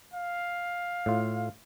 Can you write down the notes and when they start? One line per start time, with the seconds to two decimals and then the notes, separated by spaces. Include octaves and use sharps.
0.14 F5
1.06 A2 F4